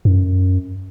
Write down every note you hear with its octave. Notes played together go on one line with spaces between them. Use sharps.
F#2